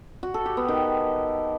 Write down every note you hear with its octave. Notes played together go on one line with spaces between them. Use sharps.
F#4
A4
G4
B3
D#3